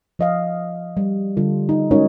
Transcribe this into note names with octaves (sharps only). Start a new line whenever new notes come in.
F3 D#5 F5
G3
D3 G3 F4 A4
D#4
G#3 C#4 D#4 F#4 A#4 C#5